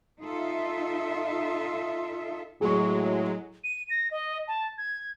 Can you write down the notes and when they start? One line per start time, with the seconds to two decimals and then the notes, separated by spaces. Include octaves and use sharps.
0.20 D#4 F4 A4 E5
2.61 A2 F#3 G#3 G#4 C#6
3.64 D#7
3.90 A#6
4.11 D#5
4.48 A5
4.78 G#6